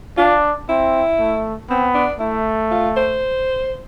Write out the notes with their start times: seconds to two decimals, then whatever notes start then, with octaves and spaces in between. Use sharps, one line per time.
0.18 D4 F4
0.69 C4 E4
1.19 A3
1.70 B3 C4
1.95 D4
2.20 A3 E4
2.71 F4
2.97 C5